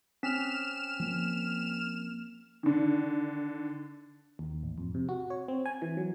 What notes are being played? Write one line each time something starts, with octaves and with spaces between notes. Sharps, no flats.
C4 C#4 F6 B6 E7
F3 A#3
D3 D#3
D#2
A1
F2
C3
F#4
C#5
C4
G#5
E3
F#3